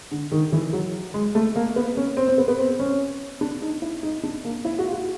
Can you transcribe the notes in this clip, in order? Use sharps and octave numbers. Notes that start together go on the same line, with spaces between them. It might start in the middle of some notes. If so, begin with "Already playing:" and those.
D3
D#3
E3
F#3
G#3
A3
A#3
B3
C#4
C4
C4
B3
B3
C4
C#4
D4
D#4
E4
D#4
D4
A#3
E4
F#4
F4
F#4